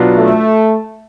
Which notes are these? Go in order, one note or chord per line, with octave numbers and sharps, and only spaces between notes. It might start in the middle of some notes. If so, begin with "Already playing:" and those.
Already playing: B2 F#3 B3 D4 F4
A3